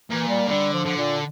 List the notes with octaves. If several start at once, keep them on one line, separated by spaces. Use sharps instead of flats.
A#2 E3
G3
D3 G3
F3
D3
A#2